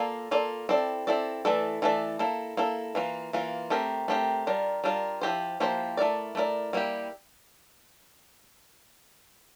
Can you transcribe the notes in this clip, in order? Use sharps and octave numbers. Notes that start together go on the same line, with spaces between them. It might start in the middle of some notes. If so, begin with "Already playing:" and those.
Already playing: A#3 F4 A4 D5
A#3 F4 A4 D5
C4 E4 A4 D5
C4 E4 A4 D5
E3 A3 E4 A4 D5
E3 A3 E4 A4 D5
A#3 E4 A4
A#3 E4 A4
E3 A#3 F4
E3 A#3 F4
A3 C4 G4 A#4
A3 C4 G4 A#4
G3 D4 F4 A#4
G3 D4 F4 A#4
F3 A#3 E4 G4 C5
F3 A#3 E4 G4 C5
A3 E4 A#4 D5
A3 E4 A#4 D5
G3 A#3 E4 G4